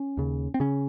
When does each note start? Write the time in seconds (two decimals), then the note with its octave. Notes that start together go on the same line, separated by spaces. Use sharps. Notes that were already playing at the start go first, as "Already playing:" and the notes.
Already playing: C#4
0.17 D#2 C#3
0.54 C4
0.60 C#3 C#4